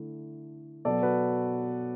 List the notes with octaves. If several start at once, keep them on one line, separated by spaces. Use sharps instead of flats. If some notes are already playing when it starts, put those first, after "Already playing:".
Already playing: D3 A3 E4
B2 F#3 B3 A4 D5
F#4 B4